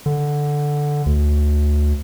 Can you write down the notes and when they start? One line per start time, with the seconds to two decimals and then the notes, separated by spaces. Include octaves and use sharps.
0.06 D3
1.06 D2